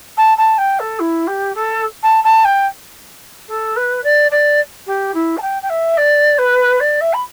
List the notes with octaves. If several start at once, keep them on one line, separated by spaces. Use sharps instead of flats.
A5
A5
G5
A4
E4
G4
A4
A5
A5
G5
A4
B4
D5
D5
G4
E4
A5
G5
G5
E5
D5
B4
D5
E5
B5